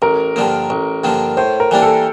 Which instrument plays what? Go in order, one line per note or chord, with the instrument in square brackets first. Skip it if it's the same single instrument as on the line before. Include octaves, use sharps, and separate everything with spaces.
[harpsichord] A1 [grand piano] A#4
[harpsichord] G2 D3 F3 A#3
A1
G2 D3 F3 A#3
[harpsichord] A2 [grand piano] C5
[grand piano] A#4
[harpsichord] E3 G3 A#3 D4
[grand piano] A4